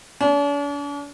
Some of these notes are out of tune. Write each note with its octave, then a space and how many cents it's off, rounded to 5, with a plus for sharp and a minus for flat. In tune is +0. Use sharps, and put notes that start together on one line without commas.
D4 -45